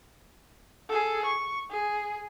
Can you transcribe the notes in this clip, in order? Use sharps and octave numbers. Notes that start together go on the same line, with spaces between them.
G#4 A4
C#6
G#4